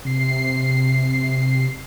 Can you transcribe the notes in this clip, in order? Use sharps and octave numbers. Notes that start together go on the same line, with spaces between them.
C3 C7